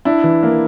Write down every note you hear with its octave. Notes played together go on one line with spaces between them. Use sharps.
D4 E4
E3
A#3